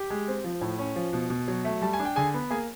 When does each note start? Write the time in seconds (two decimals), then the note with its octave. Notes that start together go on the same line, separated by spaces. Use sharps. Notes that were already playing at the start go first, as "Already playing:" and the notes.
Already playing: G4 G5
0.10 G#3
0.28 C4
0.44 F3
0.61 A2
0.79 C#4
0.96 F3
1.13 B2
1.30 B2
1.48 F#3
1.65 A3
1.82 G3 A5
1.93 G#5
1.99 D4
2.05 G5
2.16 D3 G#4 G#5
2.34 B3
2.50 A#3 G#4 G#5